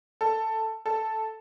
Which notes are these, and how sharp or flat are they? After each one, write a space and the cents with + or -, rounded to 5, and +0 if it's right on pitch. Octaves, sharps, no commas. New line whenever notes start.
A4 +10
A4 -5